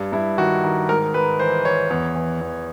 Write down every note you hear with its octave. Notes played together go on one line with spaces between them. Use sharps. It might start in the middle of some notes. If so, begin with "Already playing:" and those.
Already playing: G2
G2 E4
D#3 F#4
D#3
G#2 A#4
G#2 B4
E3 C5
E3 C#5
E2 C#5
E3
E2